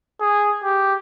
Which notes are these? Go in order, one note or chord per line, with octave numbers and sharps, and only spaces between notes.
G#4
G4